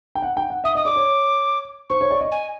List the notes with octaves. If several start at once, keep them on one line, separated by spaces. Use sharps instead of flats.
G5
F#5
G5
F#5
E5 D#6
D#5 D#6
D5 D6
C#5
C5 C#6
C#5
D5
D#5
G#5